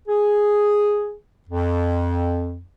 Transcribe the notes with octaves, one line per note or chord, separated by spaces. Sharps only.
G#4
F2